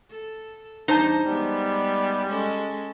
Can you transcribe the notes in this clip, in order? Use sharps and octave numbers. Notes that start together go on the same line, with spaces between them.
A4
E2 G3 D#4 C5 A5
G3 G#3 B3
G#3 C#4 A4